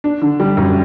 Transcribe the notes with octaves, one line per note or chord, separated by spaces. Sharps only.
D4
D3
G3
F#2